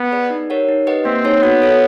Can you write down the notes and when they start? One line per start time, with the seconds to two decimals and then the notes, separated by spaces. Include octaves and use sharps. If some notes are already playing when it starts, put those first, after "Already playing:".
Already playing: B3
0.12 G#4 B4 D5
0.30 D#4
0.50 G4 A#4 C#5 F#5
0.69 D#4
0.87 G4 B4 D#5 F#5
1.05 A#3 C4
1.24 D#4 G#4 C#5
1.42 B3 F#4
1.62 A4 C#5